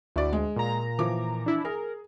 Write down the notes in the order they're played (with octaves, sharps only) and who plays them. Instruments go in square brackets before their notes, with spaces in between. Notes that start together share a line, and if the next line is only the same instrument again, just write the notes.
[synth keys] D2 [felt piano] E4 F#4 D5
[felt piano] G#3
[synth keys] A#2 A#5
[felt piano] E3 F3 D6
[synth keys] D4 E4
[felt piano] G#4 [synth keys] A#4